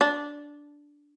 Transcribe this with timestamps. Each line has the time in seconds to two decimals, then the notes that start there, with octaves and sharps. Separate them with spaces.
0.01 D4